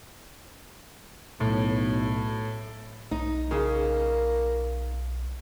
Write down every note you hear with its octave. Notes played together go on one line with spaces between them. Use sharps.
B1 A2
B1 D#4
C#3 A#3